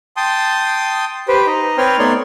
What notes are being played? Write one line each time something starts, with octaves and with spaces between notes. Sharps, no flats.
G5 A5 C6 D#6
G4 B4 C5 G5
D#4 D#5
C4 B4 C#5 G5 C6 F6
A3 B3 D#4 C#5 D5 C6